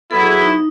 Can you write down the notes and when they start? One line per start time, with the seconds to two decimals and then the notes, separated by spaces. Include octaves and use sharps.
0.11 F#3 B3 E4 A4
0.21 G#4
0.31 F#4
0.42 D#4